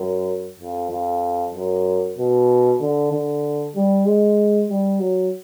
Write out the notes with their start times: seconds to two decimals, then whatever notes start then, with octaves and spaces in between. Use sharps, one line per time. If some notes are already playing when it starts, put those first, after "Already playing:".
Already playing: F#2
0.59 F2
0.91 F2
1.54 F#2
2.18 B2
2.81 D3
3.12 D3
3.75 G3
4.06 G#3
4.70 G3
5.00 F#3